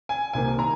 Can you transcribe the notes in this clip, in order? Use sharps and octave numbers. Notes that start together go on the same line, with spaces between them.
G#5
C2 C3 D#3 A#3 G#5
A#5